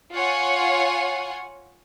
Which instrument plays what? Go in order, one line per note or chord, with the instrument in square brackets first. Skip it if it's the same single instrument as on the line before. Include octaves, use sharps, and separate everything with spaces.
[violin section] F4 C#5 F#5 G#5